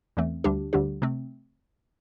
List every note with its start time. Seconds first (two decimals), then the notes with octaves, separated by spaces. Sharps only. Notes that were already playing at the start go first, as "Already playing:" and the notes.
0.17 E2 E3 A3 C4
0.44 D2 D3 G3 D4 G4
0.73 D2 D3 G3 D4 G4
1.02 C3 A3 C4